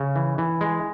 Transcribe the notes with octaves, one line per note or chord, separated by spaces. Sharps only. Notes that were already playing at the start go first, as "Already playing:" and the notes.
Already playing: C#3
E3
E3
G#3